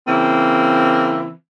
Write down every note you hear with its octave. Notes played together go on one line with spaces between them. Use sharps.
C#3 E3 A#3 C4